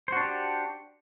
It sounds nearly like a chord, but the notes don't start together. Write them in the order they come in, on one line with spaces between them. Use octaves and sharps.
C5 F#4 D4 G4